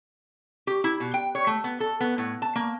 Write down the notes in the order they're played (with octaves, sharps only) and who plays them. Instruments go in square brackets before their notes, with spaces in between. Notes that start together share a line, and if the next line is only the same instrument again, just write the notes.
[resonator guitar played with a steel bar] G4
E4
B2
G5
C#5
A3
B3
A4
B3
A2
A5
A#3